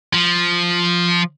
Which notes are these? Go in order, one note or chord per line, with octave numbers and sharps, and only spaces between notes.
F3